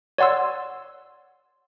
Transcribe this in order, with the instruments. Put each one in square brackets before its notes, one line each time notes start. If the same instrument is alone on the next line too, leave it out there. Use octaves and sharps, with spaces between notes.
[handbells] C#5 D5 F#5 C6 E6